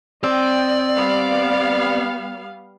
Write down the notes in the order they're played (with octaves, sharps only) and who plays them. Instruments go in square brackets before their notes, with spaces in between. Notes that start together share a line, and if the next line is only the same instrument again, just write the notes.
[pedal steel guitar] C4 [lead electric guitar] D5 [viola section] D#5 G5
[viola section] G3 B3 F5